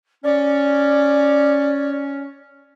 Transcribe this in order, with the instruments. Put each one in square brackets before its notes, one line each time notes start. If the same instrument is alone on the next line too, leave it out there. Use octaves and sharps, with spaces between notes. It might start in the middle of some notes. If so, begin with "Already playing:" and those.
[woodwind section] C#4 [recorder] D5